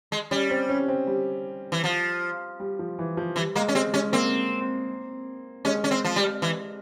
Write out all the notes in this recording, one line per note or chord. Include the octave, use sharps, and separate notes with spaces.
G#3
G3 C#4
C4
C#4
C4
G3
E3
F3
G3
F3
E3
F3
E3 G3
G#3 A#3
C#4
G#3 C4
G#3 C#4
A#3 C4
G#3 C#4
C#4
C4
F3
G3
E3